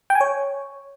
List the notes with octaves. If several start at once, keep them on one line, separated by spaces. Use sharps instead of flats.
G5
G#5
C#5